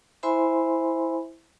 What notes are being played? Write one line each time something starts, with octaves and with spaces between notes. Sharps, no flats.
E4 C5 E5 G#5 B5 C6